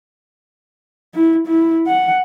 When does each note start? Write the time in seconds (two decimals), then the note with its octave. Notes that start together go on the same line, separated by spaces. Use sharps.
1.14 E4
1.47 E4
1.87 F#5